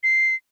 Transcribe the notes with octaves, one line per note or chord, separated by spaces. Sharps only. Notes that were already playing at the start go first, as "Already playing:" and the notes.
C7